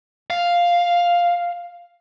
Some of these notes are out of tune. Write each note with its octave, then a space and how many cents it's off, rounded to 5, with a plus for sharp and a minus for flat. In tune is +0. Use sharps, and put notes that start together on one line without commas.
F5 +0